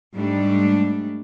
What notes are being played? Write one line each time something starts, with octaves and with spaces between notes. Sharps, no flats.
G#2 G3 A3 D4